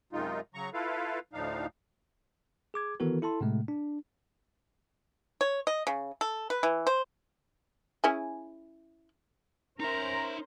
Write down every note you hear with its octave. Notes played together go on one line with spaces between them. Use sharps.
F#2 C3 D#3 G#3 D#4 F4
C#3 F#3 A#5 C#6
E4 F4 A4 B4 F5
D2 A2 F3 D4 D#4 F5
G#4 D6 G#6
D#3 E3 B3 F#4 A4 A#4
E4 A4 A5 C6
A2 C3 G#3 A3
D4
C#5
D#5
C#3
A4
B4
E3
C5
C#4 E4 G#4
C#4 D#4 A#4 C5 E5 A#5